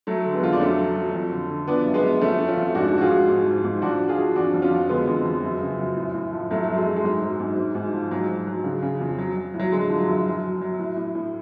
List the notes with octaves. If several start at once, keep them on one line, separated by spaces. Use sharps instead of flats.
F#3 A3
D3
G#3 B3
F2 F4
D4
F#3 A3 C#4
F#3
F#3
F2
D3
D3
F3 B3 D4
F#2
G#3 B3
F#2
F2 A3 C#4
F2
C#4 F4
F2
G#2 D4 F#4
F3
F#4
F4 G#4
G#2
G#2
F3
G#2
F3 D4 F#4
F3
F4 G#4
F3
F2 D4 F#4
F2
C#4 F4
F2
D3 G#3 B3
F2
F2
F#2
C#3
F#2
A2
A2
F3
F#2 F#3 A3
F#2 F#3
G#3
F#2
G#3
G#2 F#3
F#3
G#2
G#2
G#2
F3
G#2 F#3
F#3
F#3
C#3
C#3
F2
F#3
F#3
A2
F#3
D3 G#3
F3
F#3
F#2
F#3
F#3
F#3
A2
A2
A2